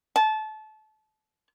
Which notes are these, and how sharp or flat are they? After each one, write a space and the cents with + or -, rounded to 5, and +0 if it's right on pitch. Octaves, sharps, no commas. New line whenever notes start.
A5 -25